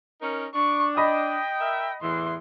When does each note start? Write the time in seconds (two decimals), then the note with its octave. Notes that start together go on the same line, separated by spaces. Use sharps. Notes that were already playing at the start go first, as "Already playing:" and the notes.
0.22 C#4 D#4 A#4
0.55 D4 C#6
0.97 D#5 G5 B5 D#6
1.60 A#4 E5
2.02 E2 A2 E3 C6